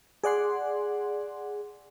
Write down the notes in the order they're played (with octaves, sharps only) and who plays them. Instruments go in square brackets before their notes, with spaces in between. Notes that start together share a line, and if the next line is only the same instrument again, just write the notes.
[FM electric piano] G#4 D5 F#5 C6